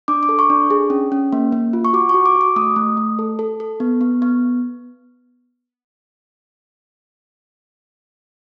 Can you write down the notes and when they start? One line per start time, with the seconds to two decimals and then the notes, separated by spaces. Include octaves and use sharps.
0.08 D4 D6
0.23 D6
0.29 A4
0.39 C#6
0.50 D4
0.70 G#4
0.90 C#4
1.12 C#4
1.33 A#3
1.52 A#3
1.73 F4
1.85 C#6
1.93 F#4 D6
2.09 C#6
2.14 F#4
2.26 D6
2.36 F#4
2.41 D6
2.56 A3 D#6
2.76 A3
2.97 A3
3.19 A4
3.39 A4
3.60 A4
3.80 B3
4.01 B3
4.22 B3